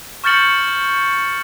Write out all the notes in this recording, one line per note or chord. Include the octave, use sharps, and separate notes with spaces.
C#6 F6 G6 A6 C#7 F#7